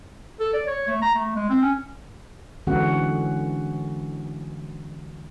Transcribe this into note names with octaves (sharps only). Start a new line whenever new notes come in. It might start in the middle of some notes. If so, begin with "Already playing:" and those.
A4
D5
C#5
A3
A#5
A3
G#3
C4
C#4
D3 E3 G#3 C#4 F#4 F#5